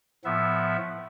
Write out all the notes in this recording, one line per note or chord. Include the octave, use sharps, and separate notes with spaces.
A2 F3 B3 E5